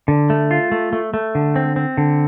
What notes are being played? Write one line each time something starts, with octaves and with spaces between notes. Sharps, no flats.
D3
A3
F4
A3
A3
A3
D3
C4
C4
D3